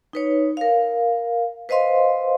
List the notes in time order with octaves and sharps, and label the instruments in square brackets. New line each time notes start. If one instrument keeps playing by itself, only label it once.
[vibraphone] D#4 B4 C#5
A#4 F5
B4 C5 D#5 F5 C6